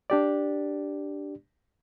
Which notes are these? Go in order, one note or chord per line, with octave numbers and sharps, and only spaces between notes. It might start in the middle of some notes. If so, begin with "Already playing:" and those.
D4 G4 D5